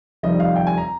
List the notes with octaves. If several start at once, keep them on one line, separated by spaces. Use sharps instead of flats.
F1 F2 D#3 G3 D#5
F5
G5
G#5
A#5